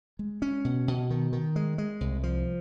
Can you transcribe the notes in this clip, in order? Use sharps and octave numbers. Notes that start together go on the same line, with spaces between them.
G#3
C#4
B2
B2
D#3
D#3
G#3
G#3
C2
F3